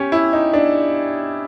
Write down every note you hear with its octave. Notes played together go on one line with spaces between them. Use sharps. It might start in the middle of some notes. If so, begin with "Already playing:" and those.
Already playing: C#4 G4
E4
D#4
D4